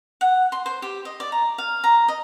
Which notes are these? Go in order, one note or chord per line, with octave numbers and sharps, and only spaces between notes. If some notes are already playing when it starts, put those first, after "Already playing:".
F#5
C6
C5
G4
D#5
D5
A#5
F5
A#5
D#5